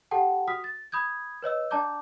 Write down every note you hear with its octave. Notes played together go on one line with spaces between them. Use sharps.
G4 A4 F#5 G5 A5
F#4 D#6 F6 B6
A6
B5 D#6 G6 G#6
B4 C#5 D#5 E6
D4 D5 A5 A#5 D6 G6